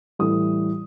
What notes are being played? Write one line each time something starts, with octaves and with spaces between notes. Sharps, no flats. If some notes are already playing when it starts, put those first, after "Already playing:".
A2 E3 G3 D#6